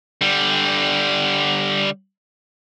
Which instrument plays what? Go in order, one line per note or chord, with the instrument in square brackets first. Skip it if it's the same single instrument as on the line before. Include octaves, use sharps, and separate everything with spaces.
[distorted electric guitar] D3 G3